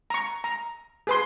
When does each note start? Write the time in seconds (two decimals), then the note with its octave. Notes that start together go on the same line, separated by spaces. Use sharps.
0.10 A#5 C#6
0.44 A#5
1.07 G#4 B4 C6